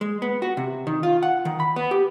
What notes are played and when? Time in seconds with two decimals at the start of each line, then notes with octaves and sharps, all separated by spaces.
0.01 G#3
0.22 B3
0.42 F#4
0.57 C3
0.87 D#3
1.03 F4
1.23 F#5
1.45 D#3
1.60 B5
1.76 B3
1.91 G4